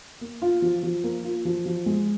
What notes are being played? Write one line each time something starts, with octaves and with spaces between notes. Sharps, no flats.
A#3
F4
F3
F3
A#3
F4
F3
F3
G#3